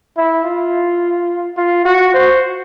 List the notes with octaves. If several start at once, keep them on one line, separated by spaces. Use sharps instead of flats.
E4
F4
F4
F#4
C5